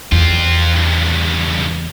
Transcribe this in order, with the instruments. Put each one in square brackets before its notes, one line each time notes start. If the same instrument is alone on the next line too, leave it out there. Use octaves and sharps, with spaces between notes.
[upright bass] E2 [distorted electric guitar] C4 F4
[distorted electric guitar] C#2 G2